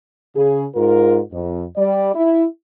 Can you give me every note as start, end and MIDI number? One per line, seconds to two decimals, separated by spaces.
0.35 0.64 49
0.35 0.64 68
0.75 1.20 44
0.75 1.20 65
0.75 1.20 70
1.32 1.64 41
1.77 2.11 55
1.77 2.11 74
2.14 2.44 64